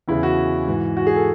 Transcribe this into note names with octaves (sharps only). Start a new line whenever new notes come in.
E2 C#3 E3 E4
F#4
G#2 E3
F#4
G#4
A4